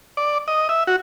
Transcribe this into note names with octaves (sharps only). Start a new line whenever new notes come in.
D5
D#5
E5
F#4